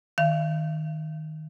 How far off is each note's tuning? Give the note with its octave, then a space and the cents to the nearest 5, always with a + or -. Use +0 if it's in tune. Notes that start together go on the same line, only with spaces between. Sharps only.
D#3 +0 F5 -35